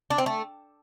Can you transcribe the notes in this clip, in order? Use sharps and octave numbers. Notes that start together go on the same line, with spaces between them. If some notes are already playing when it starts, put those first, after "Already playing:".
D4
C4
A3